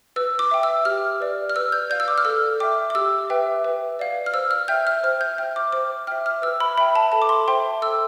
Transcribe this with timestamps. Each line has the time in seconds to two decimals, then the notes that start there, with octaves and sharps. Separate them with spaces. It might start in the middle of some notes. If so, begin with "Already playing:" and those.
0.16 B4 E6
0.39 D6
0.51 E5 G5
0.63 E6
0.85 G4 F6
1.20 B4 D5
1.50 F6
1.56 B4 E6
1.72 G6
1.90 D5 F5 G6
2.00 E6
2.08 D6
2.18 F6
2.25 A4 E6
2.60 E5 G5 D6
2.90 D6
2.95 G4 E6
3.30 B4 E5 G5
3.64 B4
3.99 D5 F5
4.26 F6
4.34 C5 E6
4.51 F6
4.68 E5 G5 G6
4.87 F6
5.03 C5 F6
5.21 G6
5.38 E5 G5 F6
5.56 D6
5.72 C5 D6
6.07 E5 G5 F6
6.26 F6
6.42 B4 E6
6.60 B5
6.78 E5 G5 B5
6.95 A5
7.12 A4 A5
7.22 D6
7.29 C6
7.48 C5 E5 G5 C6
7.82 A4 E6